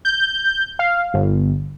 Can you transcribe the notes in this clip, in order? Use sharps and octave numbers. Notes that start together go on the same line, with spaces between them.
G6
F5
G1